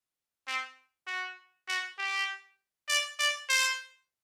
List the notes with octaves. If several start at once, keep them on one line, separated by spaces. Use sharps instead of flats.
C4
F#4
F#4
G4
D5
D5
C5